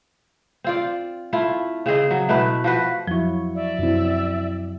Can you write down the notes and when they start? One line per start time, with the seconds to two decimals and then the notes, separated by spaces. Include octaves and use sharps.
0.64 C4 F4 D5
1.33 A3 E4 F4
1.86 C#3 C4 G#4 D#5
2.11 F#3
2.29 B2 A3 E4 B4
2.64 F3 F#4 B4
3.07 F2 F3 F#3 E4 C#6
3.54 D5 E5
3.79 F#2 C3 F#3 C4 E4